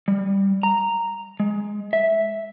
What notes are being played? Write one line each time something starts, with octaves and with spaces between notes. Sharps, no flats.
G3
A#5
G#3
E5